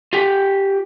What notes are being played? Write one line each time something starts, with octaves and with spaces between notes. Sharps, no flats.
F4 G4 G5